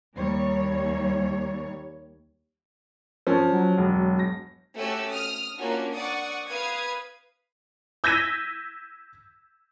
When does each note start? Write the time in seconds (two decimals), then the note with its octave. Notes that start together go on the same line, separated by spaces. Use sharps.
0.14 D#2 G3 C#5
3.27 F3 C#4
3.52 F#3
3.78 E1
4.19 A#6
4.75 A3 C#4 F#4 G4 E6
5.11 D#6 F6
5.58 A#3 C#4 D4 F4 F#4
5.93 D5 F#5 C#6 D#6
6.50 B4 F5 D#6 G#6
8.04 E6 G6 G#6 A#6 B6 D#7